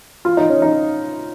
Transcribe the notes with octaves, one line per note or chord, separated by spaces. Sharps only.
F4
D#4
C#4
D#4